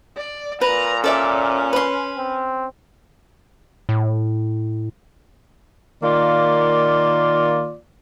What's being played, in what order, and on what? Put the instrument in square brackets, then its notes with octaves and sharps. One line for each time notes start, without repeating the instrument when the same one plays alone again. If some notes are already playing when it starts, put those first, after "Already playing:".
[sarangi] D5
[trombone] A#2 [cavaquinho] B4 [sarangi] A#5
[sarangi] C#4 [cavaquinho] A4 D5 E5
[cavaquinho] B4 C6
[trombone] C4
[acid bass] A2
[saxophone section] D#3 A#3 F4 D5